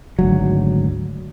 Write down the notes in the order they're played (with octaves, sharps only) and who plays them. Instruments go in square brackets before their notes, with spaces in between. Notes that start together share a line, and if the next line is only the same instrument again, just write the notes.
[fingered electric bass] G#1 D2 F#3